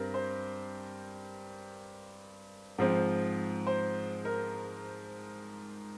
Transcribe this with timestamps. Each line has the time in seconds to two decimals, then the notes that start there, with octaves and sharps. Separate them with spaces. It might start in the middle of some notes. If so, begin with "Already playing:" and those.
Already playing: G2 G3 C4 A#4
0.14 C5
2.78 G#2 F3 C4
3.67 C5
4.25 A#4